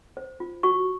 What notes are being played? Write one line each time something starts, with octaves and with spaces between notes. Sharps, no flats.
C5
F4
F#4 C#6